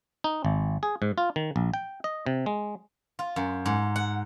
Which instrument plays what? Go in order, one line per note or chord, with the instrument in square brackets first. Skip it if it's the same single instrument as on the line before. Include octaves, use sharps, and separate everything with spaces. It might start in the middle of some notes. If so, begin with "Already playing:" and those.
[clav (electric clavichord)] D#4
G#1
G#4
G#2
F4
D#3
A#1
G5
D#5
C3
G#3
[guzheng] F4
F#2
G#2
F#5